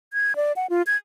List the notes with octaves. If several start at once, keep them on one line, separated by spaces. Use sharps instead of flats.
G#6
D5
F#5
F4
G#6